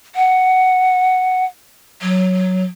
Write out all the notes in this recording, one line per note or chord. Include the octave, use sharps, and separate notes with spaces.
F#5
F#3